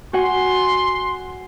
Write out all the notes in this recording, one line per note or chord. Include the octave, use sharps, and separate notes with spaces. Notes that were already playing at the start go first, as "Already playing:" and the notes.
F#4 F#5 G#5 C6